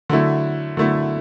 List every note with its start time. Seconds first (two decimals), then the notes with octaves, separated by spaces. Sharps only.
0.09 D3 F#3 A3 E4
0.77 D3 F#3 A3 E4